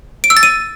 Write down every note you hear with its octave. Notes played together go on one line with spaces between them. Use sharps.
D7
E6
A6
D#7